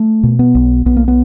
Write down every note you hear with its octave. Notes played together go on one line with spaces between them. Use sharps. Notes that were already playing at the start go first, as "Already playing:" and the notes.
Already playing: A3
B2
B3
B1
B1 B3
A#3
B3